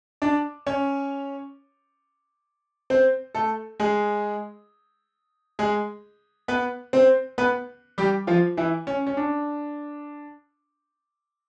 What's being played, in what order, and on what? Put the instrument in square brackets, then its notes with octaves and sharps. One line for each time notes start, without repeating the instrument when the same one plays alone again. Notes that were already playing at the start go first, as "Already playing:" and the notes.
[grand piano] D4 D5
C#4 C#5
C4 C5
A3 A4
G#3 G#4
G#3 G#4
B3 B4
C4 C5
B3 B4
G3 G4
F3 F4
E3 E4
C#4
C#4
D4